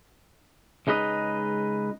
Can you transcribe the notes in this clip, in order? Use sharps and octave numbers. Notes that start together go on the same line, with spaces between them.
C#2 G#3 D#4 B4 D#5